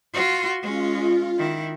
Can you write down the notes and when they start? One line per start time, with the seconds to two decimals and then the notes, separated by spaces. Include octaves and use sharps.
0.13 F4 F#4 C6
0.62 G#3 C#4 F4
1.38 D#3 E4